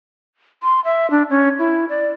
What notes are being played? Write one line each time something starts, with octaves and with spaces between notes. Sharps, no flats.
C6
E5
D4
C#4
E4
D5